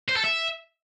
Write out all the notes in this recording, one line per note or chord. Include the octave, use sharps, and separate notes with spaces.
C5
A4
E5